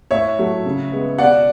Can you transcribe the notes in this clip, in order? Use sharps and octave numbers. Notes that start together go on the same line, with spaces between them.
A2 C#5 E5
F#3 A3
C#3
G#3 B3
B2 D5 F#5